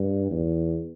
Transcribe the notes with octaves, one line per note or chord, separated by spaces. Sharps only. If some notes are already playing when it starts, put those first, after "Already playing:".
Already playing: G2
E2